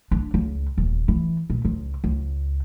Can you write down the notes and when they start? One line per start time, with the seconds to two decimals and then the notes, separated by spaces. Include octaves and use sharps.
0.11 D4
0.34 C#2
0.78 D#1
1.08 E3
1.50 A#2
1.65 C#2
2.04 C#2